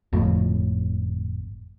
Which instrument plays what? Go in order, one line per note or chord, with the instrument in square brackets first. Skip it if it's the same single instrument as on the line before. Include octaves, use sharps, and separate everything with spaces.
[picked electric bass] G1 F2 A2